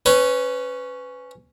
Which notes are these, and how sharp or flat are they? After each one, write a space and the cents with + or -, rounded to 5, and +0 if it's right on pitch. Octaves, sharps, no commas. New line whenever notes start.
C#4 +0 B4 +25